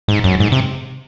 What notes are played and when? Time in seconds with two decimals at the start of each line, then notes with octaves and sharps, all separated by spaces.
0.08 G#2
0.24 F#2
0.40 G#2
0.52 C3